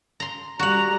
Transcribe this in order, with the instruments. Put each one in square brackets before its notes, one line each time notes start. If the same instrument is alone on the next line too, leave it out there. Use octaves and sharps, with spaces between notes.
[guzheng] A#5 C6
[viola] G3 A#5 [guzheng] F#4 F#5